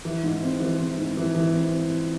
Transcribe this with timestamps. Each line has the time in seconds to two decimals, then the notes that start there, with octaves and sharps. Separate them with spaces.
0.05 E3
0.23 G#2
0.42 C4
0.60 E3
0.79 C4
0.98 G#2
1.17 E3
1.35 E3
1.54 C4